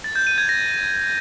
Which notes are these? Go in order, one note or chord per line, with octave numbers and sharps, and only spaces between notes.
A6
G6
D#7
G#6
A#6